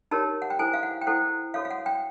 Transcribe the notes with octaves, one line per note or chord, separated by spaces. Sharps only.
D#4 G4 A#4 C#5 A5
F#5
G5
E4 A4 C5 G#5
F5
F#5
G5
E4 A4 C5 F#5
F#4 A4 C#5 F5
F5
F#5
G5